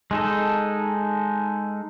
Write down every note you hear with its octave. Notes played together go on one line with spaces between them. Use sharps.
G#3 D#4 A4